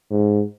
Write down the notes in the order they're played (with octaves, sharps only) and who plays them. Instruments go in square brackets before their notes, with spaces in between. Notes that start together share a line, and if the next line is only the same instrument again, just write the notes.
[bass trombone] G#2